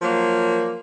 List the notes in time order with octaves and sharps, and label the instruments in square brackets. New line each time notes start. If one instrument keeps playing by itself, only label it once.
[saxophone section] F3 F#3 A#3